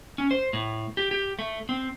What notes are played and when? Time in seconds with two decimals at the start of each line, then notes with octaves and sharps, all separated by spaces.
0.18 C#4
0.31 C5
0.53 A2
0.97 G4
1.11 G4
1.39 A3
1.69 C4